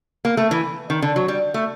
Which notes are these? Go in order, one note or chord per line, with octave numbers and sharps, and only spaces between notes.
A#3
A3
E3
D#3
D3
F#3
G3
A3